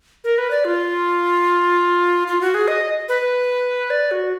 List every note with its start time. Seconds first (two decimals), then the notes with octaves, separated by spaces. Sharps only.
0.24 A#4
0.38 B4
0.50 D5
0.64 F4
2.27 F4
2.41 F#4
2.54 G#4
2.68 D#5
3.08 B4
3.90 D5
4.11 F#4